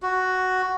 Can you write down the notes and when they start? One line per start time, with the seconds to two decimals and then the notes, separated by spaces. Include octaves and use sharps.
0.02 F#4